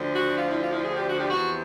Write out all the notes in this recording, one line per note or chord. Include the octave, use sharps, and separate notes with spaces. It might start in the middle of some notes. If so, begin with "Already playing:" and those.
Already playing: D2 D3 F3
F#4
F4
E4
F4
E4
G#4
G4
F#4
G4
E2 C3 F3 F#4